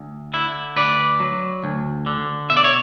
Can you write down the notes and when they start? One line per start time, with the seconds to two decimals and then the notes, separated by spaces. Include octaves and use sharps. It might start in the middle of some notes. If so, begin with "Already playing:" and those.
Already playing: D2
0.33 D3 E4
0.76 D2 B4 D5
1.20 F#3
1.64 D2
2.06 D3
2.50 B2 E5
2.57 D5
2.64 C#5